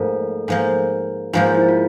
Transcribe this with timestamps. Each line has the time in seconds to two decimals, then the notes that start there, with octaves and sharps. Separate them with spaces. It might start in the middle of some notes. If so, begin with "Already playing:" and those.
Already playing: G#2 F3 A3 A#3 A4
0.48 G#2 F3 A#3
1.33 G#2 F3 A#3 F4
1.55 E4
1.69 F4